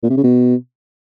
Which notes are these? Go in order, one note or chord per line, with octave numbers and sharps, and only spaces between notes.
A#2
C3
C#3
B2